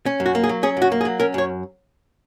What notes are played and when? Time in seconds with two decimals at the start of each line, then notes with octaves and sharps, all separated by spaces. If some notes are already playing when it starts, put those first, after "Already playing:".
0.06 C#4
0.20 F#2
0.26 F#4
0.35 A#3
0.44 G#4
0.49 F#3
0.63 C#4 G#4
0.77 F#2
0.82 F#4
0.92 A#3
1.01 G#4
1.05 F#3
1.20 C#4 A#4
1.34 F#2 C#5